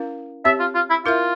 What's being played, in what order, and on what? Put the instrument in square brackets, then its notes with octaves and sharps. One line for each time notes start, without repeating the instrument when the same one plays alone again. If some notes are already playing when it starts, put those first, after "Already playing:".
Already playing: [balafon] C#4 E4 A#4 F5
[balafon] C4 G4 C#5 [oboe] E5
[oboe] F4
F4
E4
[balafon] E4 A#4 E5 [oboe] F4